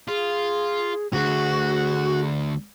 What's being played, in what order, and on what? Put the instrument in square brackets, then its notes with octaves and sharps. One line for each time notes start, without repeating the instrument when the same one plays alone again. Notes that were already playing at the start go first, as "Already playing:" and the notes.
[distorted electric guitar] F4 [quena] G#4
[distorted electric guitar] D2 [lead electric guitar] F#4 [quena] G#4